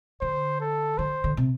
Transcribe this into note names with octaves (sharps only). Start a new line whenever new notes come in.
D3 C5
A4
D3 C5
D3
C3